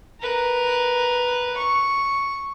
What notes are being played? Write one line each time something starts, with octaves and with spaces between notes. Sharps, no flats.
A#4 B4
C#6